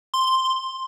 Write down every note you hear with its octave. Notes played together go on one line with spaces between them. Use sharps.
C6